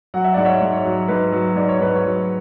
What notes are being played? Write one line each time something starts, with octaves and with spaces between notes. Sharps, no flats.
F#3 F#5
E5
G#2 D5 F#5
C#5 E5
G#2
C#5
F#3
G#2 B4
F#3
G#2 D5
C#5
G#2 B4
C#5
F#3